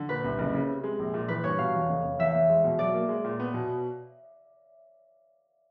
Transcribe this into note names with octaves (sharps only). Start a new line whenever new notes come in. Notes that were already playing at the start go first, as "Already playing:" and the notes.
Already playing: D3
A#2 B4
C2
F#1
C#3
C3
G#3
A#1
A#2
E3 B4
G2 C#5
B2 F5
E2
F1
F1
E2 E5
E2
G#3
B2
F#3 D5
A#3
G#3
A#2
B3
B2